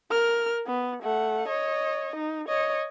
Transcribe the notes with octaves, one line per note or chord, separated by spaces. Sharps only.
A#4 F6
B3
A3 F#5
C#5 D#5
D#4
C#5 D#5